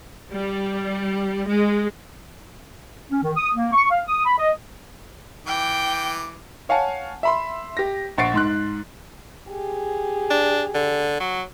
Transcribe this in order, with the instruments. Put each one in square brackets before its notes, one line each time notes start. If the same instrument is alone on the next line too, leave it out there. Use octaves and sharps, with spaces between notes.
[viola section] G3
G#3
[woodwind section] C#4
D#3
D#6
A#3
C#6
F5
D#6
B5
D#5
[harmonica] E3 D6 [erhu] G5
[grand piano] C#5 F5 F#5 G#5 A5
E5 B5 C6
G4 A#6
A#1 F#5 C#6 A6 C7 D7
G#2 C6 F#6
[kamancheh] G4 G#4
[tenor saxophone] D4
D3
F#3